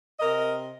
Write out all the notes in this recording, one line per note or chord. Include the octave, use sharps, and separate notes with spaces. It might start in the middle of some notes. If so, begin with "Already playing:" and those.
C3 A#4 D#5